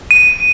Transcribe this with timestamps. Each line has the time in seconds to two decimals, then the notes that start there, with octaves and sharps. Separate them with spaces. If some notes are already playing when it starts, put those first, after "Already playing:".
0.11 D#7